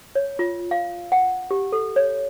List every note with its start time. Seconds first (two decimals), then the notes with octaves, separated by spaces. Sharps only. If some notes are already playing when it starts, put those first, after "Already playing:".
0.15 C#5
0.39 F4
0.71 F5
1.12 F#5
1.51 G4
1.72 A4
1.96 C#5